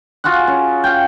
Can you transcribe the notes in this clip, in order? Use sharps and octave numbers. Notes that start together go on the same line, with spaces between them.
F4 F#4 G#4 F#5
C#4
F5 G5